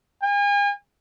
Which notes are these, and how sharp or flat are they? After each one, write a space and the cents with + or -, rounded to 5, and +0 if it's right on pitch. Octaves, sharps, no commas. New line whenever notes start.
G#5 -40